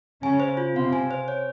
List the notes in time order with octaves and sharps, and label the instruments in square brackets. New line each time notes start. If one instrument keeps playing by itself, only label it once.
[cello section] C#3 C#4 [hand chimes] G#5
[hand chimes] C5
F4
[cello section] C3 C4 [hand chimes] F5
[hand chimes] G#5
C5
C#5